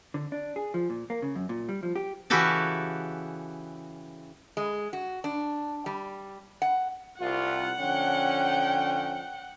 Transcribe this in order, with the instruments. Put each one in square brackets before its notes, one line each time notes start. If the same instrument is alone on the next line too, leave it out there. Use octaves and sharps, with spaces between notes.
[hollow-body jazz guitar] D3
D4
G#4
F3
A#2
A#3
C#3
F#2
A#2
G3
F3
G4
[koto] C#3 E3 E4 F#4 G4 A4
[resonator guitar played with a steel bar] G#3
F#4
D4
G3
F#5
[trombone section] C2 F4 [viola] F#5
[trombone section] D3 F3 C#4 [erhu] G5